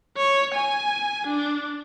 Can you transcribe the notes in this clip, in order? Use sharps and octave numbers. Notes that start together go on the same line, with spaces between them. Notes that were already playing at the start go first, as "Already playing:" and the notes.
C#5
G#5
D4